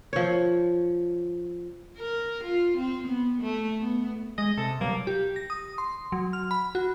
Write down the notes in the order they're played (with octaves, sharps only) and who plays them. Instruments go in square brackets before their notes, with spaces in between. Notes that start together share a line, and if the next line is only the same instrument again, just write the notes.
[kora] F3 C#5
[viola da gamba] A#4
F4
C4
B3
A3
B3
[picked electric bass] G#3 [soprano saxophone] D#5
[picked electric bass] C3 [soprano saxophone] A4
[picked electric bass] B2 F#3 G3 [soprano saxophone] A#3
[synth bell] G4
A#6
D#6
C6
F#3
F6
B5
F#4